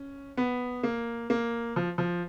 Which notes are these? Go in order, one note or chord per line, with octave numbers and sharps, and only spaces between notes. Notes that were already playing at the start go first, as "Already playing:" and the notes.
Already playing: C#4
B3
A#3
A#3
F3
F3